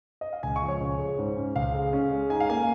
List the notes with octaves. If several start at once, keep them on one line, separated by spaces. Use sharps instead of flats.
D#5
F5
C#2 G#5
C#6
F3
C#5
C#2
G#3
G#2
C#4
C#2 F5
G#3
C#4
G#3
D#4 G#5
F5
A#3 G#5